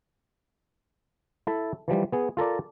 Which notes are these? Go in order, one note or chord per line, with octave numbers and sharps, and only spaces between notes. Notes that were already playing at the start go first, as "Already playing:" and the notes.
E4 A4 E5
E3 F3 G3
B3 G#4
F4 A4 A#4 D5